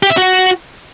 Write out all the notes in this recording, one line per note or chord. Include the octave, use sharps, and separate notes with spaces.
G4
E5
F#4